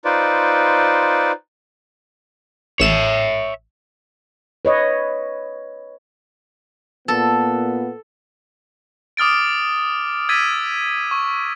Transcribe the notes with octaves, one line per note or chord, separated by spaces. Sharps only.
D#4 F4 B4 C5 D5
A1 C#5 E5 E7
B4 C#5 D#5
A#2 B3 A4
D6 D#6 F6 A6 D7
E6 G#6 A6 B6 D#7
C#6